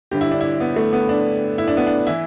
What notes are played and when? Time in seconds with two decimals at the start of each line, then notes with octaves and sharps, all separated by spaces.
0.11 G1 G2 D3 G4
0.21 E4
0.31 D4
0.41 E4
0.60 B3
0.76 A3
0.93 B3
1.09 D4
1.58 E4
1.68 D4
1.77 B3
1.86 D4
2.07 E3 E4